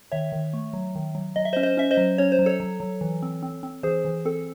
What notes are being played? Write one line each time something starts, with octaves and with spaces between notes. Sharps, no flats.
D#3 C#5 E5
D#3
A3
F#3
D#3
F#3
F#3 D#5
E5
C5 D#5
C#4
C5 D#5
C#4 E5
C5 D#5
F#3
C#4 C#5
C5
F#3
A4 C#5
F#3
F#3
E3
C4
C4
C4
E3 G#4 C5
E3
C4 A4